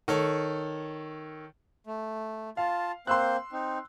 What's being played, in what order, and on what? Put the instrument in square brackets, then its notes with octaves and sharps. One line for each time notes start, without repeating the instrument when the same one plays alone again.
[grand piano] D#3 A4 C#5
[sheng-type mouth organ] A3
[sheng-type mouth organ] F4 A5 [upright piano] F5
[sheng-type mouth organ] A#3 C4 C5 [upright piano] C6 E6 F#6
[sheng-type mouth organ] C4 D#4